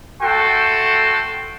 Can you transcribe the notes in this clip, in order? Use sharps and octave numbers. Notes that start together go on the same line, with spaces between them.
A3 F#4 A4 G5 C6